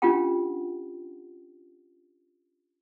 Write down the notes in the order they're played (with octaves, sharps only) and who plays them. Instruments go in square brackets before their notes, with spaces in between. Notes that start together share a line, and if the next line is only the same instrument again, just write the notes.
[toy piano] C#4 D4 F4 G4 F#5 G5